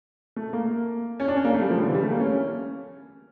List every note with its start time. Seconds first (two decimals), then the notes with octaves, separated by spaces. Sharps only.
0.36 A3
0.53 A#3
1.20 C#4
1.28 D4
1.36 C#4
1.45 A#3
1.53 A3
1.61 G3
1.70 F3
1.79 D3
1.87 E3
1.95 G3
2.03 A3
2.12 A#3
2.20 C#4